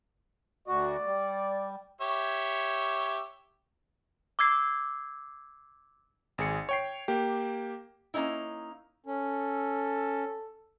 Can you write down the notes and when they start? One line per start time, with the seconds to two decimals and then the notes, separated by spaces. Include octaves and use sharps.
0.68 D2 F#4 D5
1.06 G3
2.01 G4 C#5 E5
4.39 D6 E6 G#6 C7
6.38 G#1 G#4 C#7
6.69 C#5 G5 C7
7.08 A#3 G4
8.14 A#3 C4 C#4 D#4 E4
9.06 C#4 A4